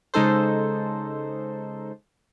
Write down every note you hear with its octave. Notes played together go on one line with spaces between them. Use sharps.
C#3 G#3 D#4 A4 C5